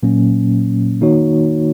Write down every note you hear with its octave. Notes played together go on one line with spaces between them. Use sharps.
A#2 F#3 A#3 C#4
D#3 A#3 D#4 F#4 C#5